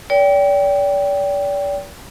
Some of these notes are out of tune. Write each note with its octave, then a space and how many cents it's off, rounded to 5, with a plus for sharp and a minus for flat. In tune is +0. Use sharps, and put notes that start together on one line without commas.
A#4 +40 D5 -40 G5 +0